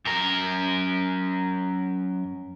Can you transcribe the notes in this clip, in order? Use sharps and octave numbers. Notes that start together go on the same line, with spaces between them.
F#2 A#4